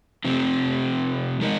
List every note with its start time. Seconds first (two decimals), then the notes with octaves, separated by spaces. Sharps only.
0.24 C3 F3 C4
1.41 G#3 D#4 A#4 D#5